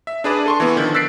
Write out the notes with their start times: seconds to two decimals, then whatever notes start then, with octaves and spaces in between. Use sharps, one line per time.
0.07 E5
0.24 D4 G#4 B4 D5
0.46 A4 C6 C#6
0.60 E3 B3
0.76 D3 D#3 F3
0.94 E6 F#6 A6 B6 C7 D7